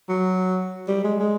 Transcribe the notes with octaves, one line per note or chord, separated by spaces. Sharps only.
F#3
G3
G#3
G#3